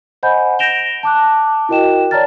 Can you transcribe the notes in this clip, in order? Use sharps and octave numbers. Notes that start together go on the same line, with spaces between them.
C5 D#5 F#5 G#5 B5 G6
G6 A#6 D7 E7 F7 G7
A5 D6 F#6
E4 F#4 A#4 D#5 G5 E7
C#5 D5 A5 A#5 F6 A6